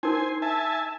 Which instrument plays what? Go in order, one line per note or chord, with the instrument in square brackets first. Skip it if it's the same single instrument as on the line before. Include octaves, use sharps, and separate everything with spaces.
[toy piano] D4 D#4 A#4 [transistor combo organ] C5 G#5
[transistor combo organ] E5 G#5 A5